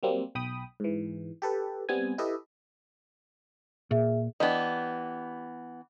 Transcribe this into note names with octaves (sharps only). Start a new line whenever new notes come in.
F#3 G3 A#3 C4
B1 G5 B5 D#6
G#2 E3
G4 A4 B4
G3 B3 C4 G#5
E4 G4 A4 B4 D#5 E5
A#2 G#4 E5
E3 B3 D4 G4 D#5